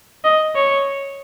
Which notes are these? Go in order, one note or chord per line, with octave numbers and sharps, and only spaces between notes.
D#5
C#5